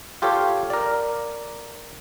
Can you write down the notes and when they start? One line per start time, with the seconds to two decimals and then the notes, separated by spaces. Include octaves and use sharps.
0.22 F4 G4 A4 C#5 F5
0.70 A#4 D5